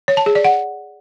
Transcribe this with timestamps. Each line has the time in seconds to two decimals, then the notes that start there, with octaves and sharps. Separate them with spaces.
0.08 C#5
0.17 A5
0.26 G#4
0.35 D5
0.45 F#5